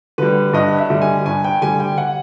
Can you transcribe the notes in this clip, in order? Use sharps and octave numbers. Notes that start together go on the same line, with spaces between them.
D3 G3 B4
G2 D#5
E5
D3 G3
G#5
G2 G#5
G5
D3 G3 G#5
G5
F#5